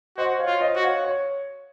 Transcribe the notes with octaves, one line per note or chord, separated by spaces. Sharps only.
F#4 C5 D#5
C#5 F5
F4
C5 D#5
F#4
C#5 F5
C#5